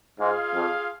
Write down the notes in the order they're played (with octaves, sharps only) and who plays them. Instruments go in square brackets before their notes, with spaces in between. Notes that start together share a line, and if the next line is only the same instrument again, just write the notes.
[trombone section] G#2 [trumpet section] F4 G#4 F5
[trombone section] F2